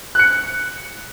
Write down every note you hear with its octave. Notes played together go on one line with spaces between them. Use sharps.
F#6 C#7